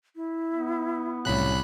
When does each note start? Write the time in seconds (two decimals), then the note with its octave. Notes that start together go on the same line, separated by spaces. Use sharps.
0.16 E4
0.52 B3
1.25 C2 A2 C#3 F#3 B5 F#6